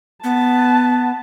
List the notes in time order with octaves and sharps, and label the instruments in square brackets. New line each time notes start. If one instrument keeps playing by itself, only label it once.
[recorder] B3 [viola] A5